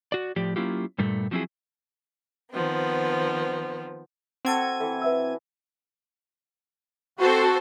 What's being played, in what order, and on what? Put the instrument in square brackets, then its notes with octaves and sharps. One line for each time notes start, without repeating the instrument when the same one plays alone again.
[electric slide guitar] F#4 D5
A2 F3 G4 D5
F#3 A#3 C#4 E4 F4 G4
G2 A#2 G3 A3
F3 F#3 C4 C#4 E4 G#4
[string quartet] D#3 F3 B3 C4
[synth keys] C4 G#6 D#7 [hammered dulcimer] F#4 A4
[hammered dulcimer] E3 [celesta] A4
[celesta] B4 E5 E6
[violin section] C4 A4 C5 [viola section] F#4